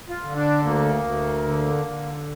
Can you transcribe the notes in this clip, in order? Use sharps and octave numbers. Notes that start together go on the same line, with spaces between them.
F4
D3
D4
D2 A#3
D2
D3
D3